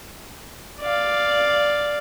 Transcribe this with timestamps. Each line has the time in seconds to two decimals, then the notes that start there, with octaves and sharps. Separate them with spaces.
0.81 D5 F5